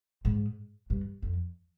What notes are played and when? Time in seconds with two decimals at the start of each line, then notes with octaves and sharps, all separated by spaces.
0.25 G#2
0.90 G2
1.22 F2